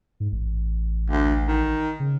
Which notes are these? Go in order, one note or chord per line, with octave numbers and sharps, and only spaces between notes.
G#2
A1
D2
D#3
C#3